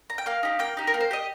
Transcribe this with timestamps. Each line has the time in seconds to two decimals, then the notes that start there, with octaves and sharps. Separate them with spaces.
0.10 A#5
0.18 G5
0.26 A#3 F5
0.43 D#4 G4
0.59 A#3 G5
0.77 D#4 G4
0.87 A#4
0.94 A#3
1.01 C5
1.11 G4 D#5